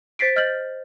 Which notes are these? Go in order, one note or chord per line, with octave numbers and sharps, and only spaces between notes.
C5 A6 B6 C7 D7
D#5 F6 G6 A6 F#7